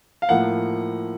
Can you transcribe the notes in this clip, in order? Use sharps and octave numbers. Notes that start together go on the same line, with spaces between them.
F5
A2 F3 A#3 F#5